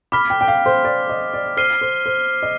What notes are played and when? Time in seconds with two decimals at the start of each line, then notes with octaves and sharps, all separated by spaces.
0.12 B5 D6 F6 B6
0.30 G5
0.41 G5
0.48 F5
0.66 C5
0.84 D5
1.09 D#5
1.34 D5
1.57 C5 F6 C7 D#7 G7
1.81 C5
2.06 C5
2.43 D#5